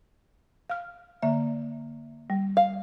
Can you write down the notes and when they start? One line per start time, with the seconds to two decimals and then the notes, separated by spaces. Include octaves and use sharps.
0.70 F5 F6
1.22 D3 A#3 E5
2.30 G3
2.57 F5